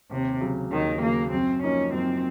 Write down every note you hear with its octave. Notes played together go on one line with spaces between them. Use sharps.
D#2 C3
C#3 F#3
D#2 D#3
C#3 F#3 A#3
F#2 C4
F3 A#3 C#4 D#4
F#2 C4